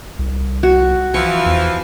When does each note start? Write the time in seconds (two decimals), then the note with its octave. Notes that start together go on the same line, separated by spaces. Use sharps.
0.19 C2
0.63 F#4
1.14 E3 F3 C#6
1.46 E2